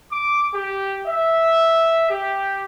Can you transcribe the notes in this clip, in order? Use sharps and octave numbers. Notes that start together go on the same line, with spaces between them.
D6
G4
E5
G4